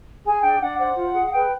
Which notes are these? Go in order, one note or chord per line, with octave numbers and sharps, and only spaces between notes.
G#4 G#5
D4 G5
D4 F#5
C5 F#5
F4
G#4
F#5
B4 G5